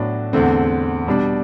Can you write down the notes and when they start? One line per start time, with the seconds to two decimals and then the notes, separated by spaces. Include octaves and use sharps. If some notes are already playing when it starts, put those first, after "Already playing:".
Already playing: A2 F#3 B3 D4
0.33 E2 D3 A3 C4
1.07 B2 G3 D4